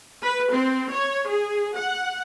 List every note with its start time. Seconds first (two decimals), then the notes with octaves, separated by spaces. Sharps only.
0.22 B4
0.51 C4
0.92 C#5
1.27 G#4
1.75 F#5